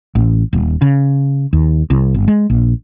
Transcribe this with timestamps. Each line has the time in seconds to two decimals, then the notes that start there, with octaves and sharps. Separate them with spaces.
0.15 A1
0.53 D#1
0.82 C#3
1.53 D#2
1.90 C2
2.14 G1
2.28 G#3
2.50 A#1